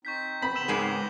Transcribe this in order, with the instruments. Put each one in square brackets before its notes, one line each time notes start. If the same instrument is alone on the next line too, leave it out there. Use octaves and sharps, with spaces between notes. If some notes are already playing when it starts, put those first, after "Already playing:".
[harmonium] C4 D#4 [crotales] C#6 G6 B6
[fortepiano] B5
[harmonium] C#3 B3 C4 [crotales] E6 E7 F#7
[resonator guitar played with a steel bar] G#2 G#3 A#4 [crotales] D6 F#7